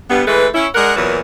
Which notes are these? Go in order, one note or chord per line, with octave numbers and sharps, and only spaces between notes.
G2 B3
E3 G#3 A3 B4
C#4 E4
G#3 D4 A#4 F#5
E2 A#2 E3 F#3 A#4